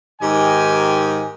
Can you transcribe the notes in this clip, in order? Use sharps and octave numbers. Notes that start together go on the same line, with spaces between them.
G#2 D#3 D#4 G4 A#4 G#5